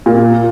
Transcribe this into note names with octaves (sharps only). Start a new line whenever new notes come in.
A#2